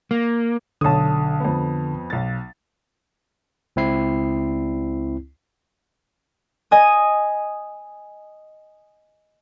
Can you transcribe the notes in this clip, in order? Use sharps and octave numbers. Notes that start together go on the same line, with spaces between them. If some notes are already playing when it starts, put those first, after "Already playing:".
A#3
B1 D3 C#5 A5 D#6
F2 B3
B1 A6
C#2 C4 E4 C7
D#5 G#5 D#6